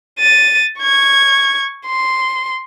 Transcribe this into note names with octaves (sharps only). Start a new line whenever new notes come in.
A6 D#7
C#6 G#6
C6